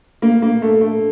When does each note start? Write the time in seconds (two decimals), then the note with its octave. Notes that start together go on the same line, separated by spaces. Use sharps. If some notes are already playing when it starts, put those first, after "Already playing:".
0.22 A#3
0.42 A#3
0.62 A3
0.81 A3